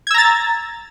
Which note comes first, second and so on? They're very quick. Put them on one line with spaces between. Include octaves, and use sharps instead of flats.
G#6 E6 A#5 A6